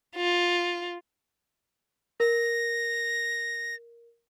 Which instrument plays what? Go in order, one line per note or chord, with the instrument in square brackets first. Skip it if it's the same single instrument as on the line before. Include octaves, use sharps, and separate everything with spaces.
[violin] F4
[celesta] A#4 [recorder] A#6